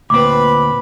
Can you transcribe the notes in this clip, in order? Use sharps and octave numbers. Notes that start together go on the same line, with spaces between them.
D2 A#2 C4 B4 B5 D6